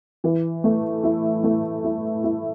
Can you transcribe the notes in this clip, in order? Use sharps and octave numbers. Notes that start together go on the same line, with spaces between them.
E3
A3
E4
A3
E4
E4